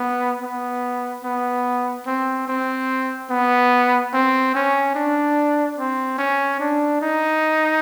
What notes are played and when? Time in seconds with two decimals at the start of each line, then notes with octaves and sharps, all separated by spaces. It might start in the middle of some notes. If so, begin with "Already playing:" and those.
Already playing: B3
0.41 B3
1.24 B3
2.06 C4
2.47 C4
3.30 B3
4.13 C4
4.55 C#4
4.95 D4
5.78 C4
6.18 C#4
6.59 D4
7.02 D#4